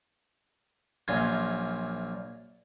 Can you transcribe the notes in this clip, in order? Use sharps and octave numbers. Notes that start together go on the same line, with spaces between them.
A#1 F#2 A#2 F4 G#5